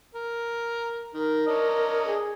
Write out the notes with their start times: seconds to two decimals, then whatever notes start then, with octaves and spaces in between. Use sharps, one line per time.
0.14 A#4
1.14 D#3 A#4
1.47 D4 C#5 D#5
2.06 G#4